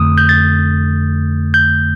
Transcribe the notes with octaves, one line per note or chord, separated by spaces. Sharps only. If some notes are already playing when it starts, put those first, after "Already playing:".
Already playing: F2 D3 A3 D#6
G6
A6
G6